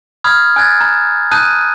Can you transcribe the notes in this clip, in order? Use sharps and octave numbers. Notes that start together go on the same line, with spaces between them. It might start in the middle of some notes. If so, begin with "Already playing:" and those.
B5 D#6 F6 G#6
G#5 F#6 G#6 A6
A#5
A5 A#5 D#6 F#6 G6 D#7